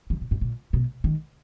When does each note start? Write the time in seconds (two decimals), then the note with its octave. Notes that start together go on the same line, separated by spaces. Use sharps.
0.10 E3
0.21 A#2
0.31 G#2
0.41 A#2
0.73 B2
1.04 D#3